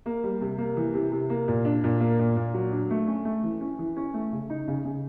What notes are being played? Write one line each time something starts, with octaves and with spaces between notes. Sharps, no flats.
A#3
G3
C3
A#3
E3
C3
C3
A#3
A#2
D4
A#2
A#3
A#2
A#2
F#3
D4
A3
C#4
A3
E3
C#4
E3
C#4
A3
C#3
D#4
C#3
C#3